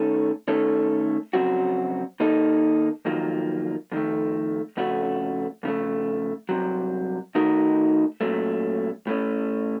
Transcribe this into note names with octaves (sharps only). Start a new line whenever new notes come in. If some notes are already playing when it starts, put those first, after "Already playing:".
Already playing: D#3 A3 C#4 A4
D#3 A3 C#4 A4
F2 C#3 F#3 C4 F#4
D#3 A#3 D#4 A4
F2 D#3 F#3 A#3 F4
F2 D#3 A3
F2 C#3 A3 C#4 F#4
F2 C#3 A3
C2 C3 F#3
D#3 A3 D#4 F#4 A#4
A#2 F#3 A3 C#4
A2 A3 C#4